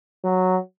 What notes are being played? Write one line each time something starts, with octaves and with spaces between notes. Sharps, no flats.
F#3